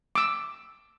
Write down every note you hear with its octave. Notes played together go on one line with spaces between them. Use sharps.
D6 E6